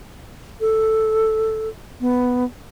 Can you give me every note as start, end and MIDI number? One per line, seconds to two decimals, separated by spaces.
0.61 1.69 69
2.01 2.44 59